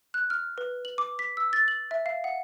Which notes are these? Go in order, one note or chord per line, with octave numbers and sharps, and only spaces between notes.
F#6
F6
B4
F#7
D6
B6
E6
A6
F#7
E5
F5
F#5